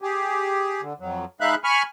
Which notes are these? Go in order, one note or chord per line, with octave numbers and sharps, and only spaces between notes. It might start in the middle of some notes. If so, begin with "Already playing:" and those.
G4 G#4
D3
F2 F#3
G#3 D#4 E5 F5 B5 F#6
G#5 B5 C#6 F6